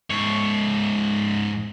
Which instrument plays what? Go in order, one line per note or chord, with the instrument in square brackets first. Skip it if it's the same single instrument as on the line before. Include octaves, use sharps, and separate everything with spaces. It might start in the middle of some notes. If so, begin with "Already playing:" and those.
[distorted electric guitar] G#2 C#5